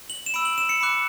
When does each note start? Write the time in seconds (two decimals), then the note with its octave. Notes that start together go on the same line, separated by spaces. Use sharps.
0.10 F#7
0.26 E7
0.34 B5 E6 D7
0.45 F#7
0.58 E7
0.69 C#7
0.81 B5 D6 F#6